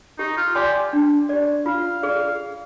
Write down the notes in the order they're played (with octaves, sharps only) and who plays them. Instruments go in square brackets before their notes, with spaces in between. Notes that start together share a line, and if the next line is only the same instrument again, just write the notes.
[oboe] D#4 [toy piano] G4
[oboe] F4
[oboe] G4 [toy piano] D5 G#5 C6
[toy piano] D4
G4 D5
[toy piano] F4 [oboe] F5
[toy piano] G#4 D5